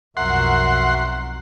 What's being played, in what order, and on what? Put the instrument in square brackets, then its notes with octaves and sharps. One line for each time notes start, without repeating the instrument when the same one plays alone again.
[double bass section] B1 F2 [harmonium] F#4 A#4 E5 [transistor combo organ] F#5 C6